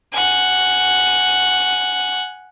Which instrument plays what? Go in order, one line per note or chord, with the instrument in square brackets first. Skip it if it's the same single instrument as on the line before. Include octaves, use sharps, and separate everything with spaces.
[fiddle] F#5 G#5